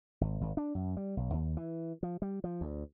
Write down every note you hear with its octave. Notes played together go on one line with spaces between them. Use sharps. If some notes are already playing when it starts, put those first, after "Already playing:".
G#1
G#1
D4
F#2
G3
B1
D#2
E3
F3
G3
F3
D2